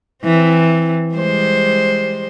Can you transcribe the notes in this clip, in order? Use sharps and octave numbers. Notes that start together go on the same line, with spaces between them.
E3 C4
G3 G#3 C5